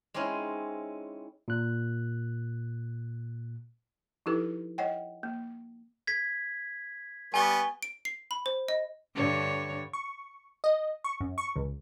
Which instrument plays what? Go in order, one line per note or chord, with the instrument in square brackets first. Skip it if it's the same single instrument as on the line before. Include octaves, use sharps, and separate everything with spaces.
[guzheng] G#3 C4 C#4 D#4 E4
[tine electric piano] A#2 F#6
[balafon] F3 D#4 E4 G4 A4 B4
C#5 D#5 F#5 G5
A#3
[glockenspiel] G#6 B6
[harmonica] G3 B3 C#6 [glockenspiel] G#5 G7
[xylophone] D7
C7
B5
C5
D#5
[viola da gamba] G2 D3 C#5
[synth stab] C#6
D#5
C#6
F#2
C#6
C#2